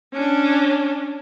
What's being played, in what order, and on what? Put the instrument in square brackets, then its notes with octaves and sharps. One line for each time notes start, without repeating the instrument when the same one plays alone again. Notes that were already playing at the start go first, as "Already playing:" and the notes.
[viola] C#4 D4